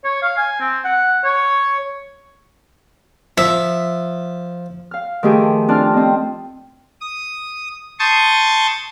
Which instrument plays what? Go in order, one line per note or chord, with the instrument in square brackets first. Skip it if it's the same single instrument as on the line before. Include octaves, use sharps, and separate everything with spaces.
[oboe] C#5
F5
G#5
C4
F#5
C#5
[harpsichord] F3 [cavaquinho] E5
[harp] F5 F6
D#3 F3 A3 G4 G#4
C4 D4 F4 A5 F6
C4 D#5
[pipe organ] D#6
A5 C6 C#6 D#6 G6 A6